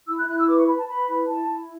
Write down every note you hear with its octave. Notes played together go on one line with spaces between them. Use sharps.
E4 E6
F#6
E4 F#6
E6
B4 D6
C#6
B4 B5
A5
B4 B5
E4
E4 A5
E4